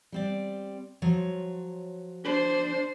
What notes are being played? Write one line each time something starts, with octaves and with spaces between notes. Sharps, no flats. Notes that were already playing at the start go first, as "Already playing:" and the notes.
G3 C4 D5
F3 F#3 C#5
D4 C5